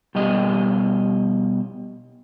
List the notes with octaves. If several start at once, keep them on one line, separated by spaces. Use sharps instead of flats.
B2 G3 G4 D#5